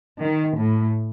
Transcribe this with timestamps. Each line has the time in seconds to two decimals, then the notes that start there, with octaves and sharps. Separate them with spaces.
0.22 D#3
0.59 A2